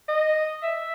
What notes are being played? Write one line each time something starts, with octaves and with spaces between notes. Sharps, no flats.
D#5
E5